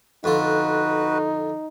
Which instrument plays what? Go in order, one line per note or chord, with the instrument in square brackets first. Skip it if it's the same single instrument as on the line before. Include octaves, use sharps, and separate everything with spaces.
[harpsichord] F2 D3 F4 [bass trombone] D#4 [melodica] F#4 B4